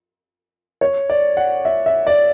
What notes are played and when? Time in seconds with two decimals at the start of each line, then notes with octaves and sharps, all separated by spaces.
0.81 C#5
1.10 D5
1.37 F#5
1.65 E5
1.86 E5
2.07 D5